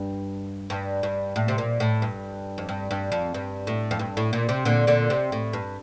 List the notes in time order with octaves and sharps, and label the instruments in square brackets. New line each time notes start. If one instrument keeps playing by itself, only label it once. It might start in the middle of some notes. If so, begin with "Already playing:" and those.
Already playing: [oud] G2
G2
G2
A2
C3
A#2
A2
G2
F2
G2
G2
F2
G2
A2
F2
G2
A2
A#2
C3
A#2 D3
A#2 D3
C3
A2
G2